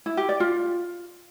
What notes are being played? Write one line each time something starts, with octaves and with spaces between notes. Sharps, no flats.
E4
G4
D5
F4